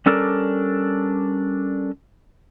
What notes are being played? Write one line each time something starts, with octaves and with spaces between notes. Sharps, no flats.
G3 C#4 D4 A4 A#4 D5